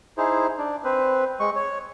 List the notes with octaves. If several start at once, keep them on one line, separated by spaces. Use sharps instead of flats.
D#4 E4 G#4 C5
D4
C4 B4 C5
G#3 C#6
C#5